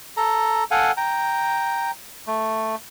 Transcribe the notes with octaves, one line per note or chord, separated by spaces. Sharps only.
A4 A#5
A4 F5 F#5 G#5
G5 A#5
A3